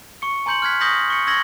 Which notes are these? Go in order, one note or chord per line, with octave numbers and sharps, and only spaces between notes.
C#6 C#7
G#5 A#5 C6 G6 C#7 F#7
F6 F#6 G#6 B6
C#6 D#6 G6 A#6 B6 F#7
C#6 C#7
C#6 E6 G#6 A#6 F#7 G7